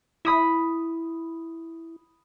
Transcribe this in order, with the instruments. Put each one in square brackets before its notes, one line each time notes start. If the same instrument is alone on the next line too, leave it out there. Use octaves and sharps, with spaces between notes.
[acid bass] E4 [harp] B5 D#6 B6